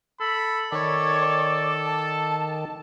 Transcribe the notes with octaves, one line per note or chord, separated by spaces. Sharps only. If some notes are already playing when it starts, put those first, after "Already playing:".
A4 B5
D#3 A4 C#5 D5
A5